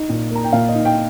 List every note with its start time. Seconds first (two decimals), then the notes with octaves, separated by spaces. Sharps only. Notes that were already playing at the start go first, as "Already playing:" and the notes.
Already playing: D#4
0.09 A#2
0.31 A#3 A#5
0.44 G5
0.53 A#2 F5
0.69 D#5
0.75 D#4
0.85 G5